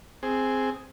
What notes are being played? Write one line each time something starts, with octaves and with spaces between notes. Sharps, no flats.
C4 G#4